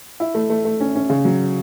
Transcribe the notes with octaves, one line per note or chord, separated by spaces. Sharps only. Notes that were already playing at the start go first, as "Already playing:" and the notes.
E4
A3
A3
A3
C#4
C#4
C#3
F#3